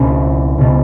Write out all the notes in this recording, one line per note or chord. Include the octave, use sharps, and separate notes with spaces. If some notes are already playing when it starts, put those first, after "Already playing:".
Already playing: C#2 B2 C#4
C#2 B2